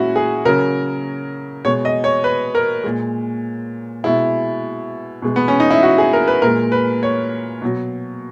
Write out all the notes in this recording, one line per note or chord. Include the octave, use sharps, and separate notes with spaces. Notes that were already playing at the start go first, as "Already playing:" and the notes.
Already playing: A#2 G#3 C#4 E4 F#4
G#4
C#3 F#3 A#4
B2 G#3 C#5
D#5
C#5
B4
A#4
A#2 G#3
B2 G#3 E4
B2 G#3
B3
C#4
D#4
E4
F#4
G#4
A#4
B4
A#2 G#3 A#4
B4
C#5
B2 F#3